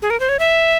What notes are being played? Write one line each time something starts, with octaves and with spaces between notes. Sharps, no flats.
G#4
A#4
C5
C#5
E5